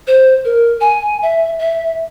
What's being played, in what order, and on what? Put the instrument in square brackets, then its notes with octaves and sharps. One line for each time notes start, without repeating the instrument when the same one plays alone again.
[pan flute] C5
A#4
G#5
E5
E5